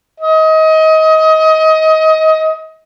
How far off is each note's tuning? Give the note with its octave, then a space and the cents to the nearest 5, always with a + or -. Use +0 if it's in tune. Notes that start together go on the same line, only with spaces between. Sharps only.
D#5 +25